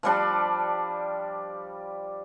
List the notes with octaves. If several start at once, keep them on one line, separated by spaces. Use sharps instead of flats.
F3 G3 D4